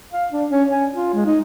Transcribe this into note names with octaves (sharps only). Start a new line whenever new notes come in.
F5
D4
C#4
G#5
F4
G#3
D#4